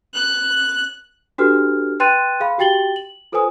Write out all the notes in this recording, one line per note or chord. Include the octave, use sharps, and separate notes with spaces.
F#6
D4 F#4 G4 A4 B4 F6
B4 G5 C6 F#6 A6 D#7
G#4 F5 B5
F#4 G4 G5 A6 F#7 G7
F#7
F4 A4 B4 C5 G#5 D#6